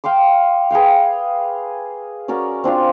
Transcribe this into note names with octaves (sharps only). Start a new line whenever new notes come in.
F5 G5 C6 D6
G#4 B4 F5 G5
C#4 F#4 A#4 D5
C4 D4 F4 F5